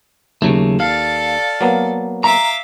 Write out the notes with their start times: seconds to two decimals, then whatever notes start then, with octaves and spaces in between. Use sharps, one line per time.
0.42 D#2 C#3 F#3 A3
0.80 A4 D5 F5
1.61 F#3 A#3 B3
2.24 E5 F5 A#5 D6